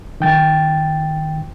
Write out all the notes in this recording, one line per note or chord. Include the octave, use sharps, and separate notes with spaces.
D#3 G5 A6